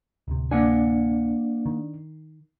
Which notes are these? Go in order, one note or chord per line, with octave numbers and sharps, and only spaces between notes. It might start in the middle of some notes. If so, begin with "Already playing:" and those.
D1 C3
A#3 D4 F#5 G#5
D#3